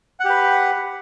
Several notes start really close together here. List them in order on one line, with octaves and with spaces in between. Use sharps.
F#5 G4 B4